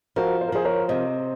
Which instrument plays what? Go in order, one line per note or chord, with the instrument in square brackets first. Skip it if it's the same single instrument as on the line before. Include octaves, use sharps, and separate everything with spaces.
[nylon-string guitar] F3 [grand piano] F#4 A#4
[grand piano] C5
A#4
[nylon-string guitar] F3 [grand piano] G#4 C5
[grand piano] A#4 C#5
[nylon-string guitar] C3 [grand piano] C5 D#5